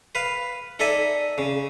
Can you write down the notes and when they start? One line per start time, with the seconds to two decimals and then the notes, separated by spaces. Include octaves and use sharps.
0.15 B4 F5
0.79 D#4 A4 D5 E5 G#5
1.38 C#3